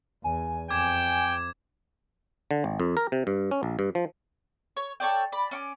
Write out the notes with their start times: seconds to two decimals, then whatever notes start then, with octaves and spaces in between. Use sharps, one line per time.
0.24 E2 G#5
0.70 F2 G5 D6 G#6
2.51 D3
2.64 G#1
2.80 F2
2.97 A#4
3.12 C3
3.27 G2
3.51 C#4
3.63 A#1
3.79 G2
3.95 F3
4.77 C#5
5.00 A4 C#5 D5 G5
5.32 D5 B5
5.51 C#4 C#6 D6